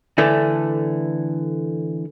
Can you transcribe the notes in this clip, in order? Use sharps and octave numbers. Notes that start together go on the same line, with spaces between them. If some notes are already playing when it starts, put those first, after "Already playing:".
D3 E3 A3